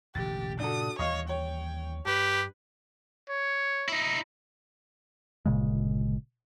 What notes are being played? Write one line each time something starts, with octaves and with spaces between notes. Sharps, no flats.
E1 A1 D3 G4 A6
G2 A#2 C#3 D4 F#4 A4 D#6
D#2 E3 G3 C#5 D#5 F5 C#6
C#5 G5
G2 G4 B4
C#5
D#4 E4
G1 A#2 C#3 G#3